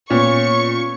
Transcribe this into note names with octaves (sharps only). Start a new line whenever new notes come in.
A#2 B3 C#4 F4 C#5 C#6